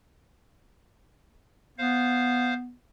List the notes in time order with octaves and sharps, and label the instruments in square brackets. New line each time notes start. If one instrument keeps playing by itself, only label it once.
[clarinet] B3 [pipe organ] C5 F5